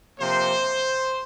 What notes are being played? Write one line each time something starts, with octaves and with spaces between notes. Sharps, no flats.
C3 F3 A#3 C5